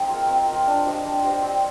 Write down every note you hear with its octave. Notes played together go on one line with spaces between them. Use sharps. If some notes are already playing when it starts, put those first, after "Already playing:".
Already playing: C4 D#4 G#4 D#5
F4 A#4
C4
F4 A#4
D4
G4 C5 D#5
D4
G4 C5 D#5
C4